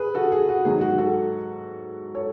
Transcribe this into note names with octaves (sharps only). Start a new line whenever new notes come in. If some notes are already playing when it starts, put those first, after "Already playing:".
Already playing: G#4 B4
F#4 A4
G#4
F#4
G#2 D#3 F#3 G#4
F#4
F#4 A4
A4 C#5